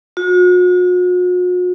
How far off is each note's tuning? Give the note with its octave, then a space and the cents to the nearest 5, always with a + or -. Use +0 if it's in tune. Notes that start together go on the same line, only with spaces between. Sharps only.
F#4 -45